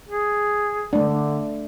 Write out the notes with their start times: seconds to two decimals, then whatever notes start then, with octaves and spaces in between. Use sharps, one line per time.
0.09 G#4
0.93 D3 A3 D4